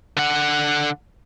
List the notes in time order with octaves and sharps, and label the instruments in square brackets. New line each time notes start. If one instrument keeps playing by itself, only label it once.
[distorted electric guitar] D3 F#5